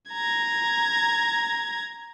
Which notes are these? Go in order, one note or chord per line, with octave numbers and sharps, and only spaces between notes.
A#5 G#6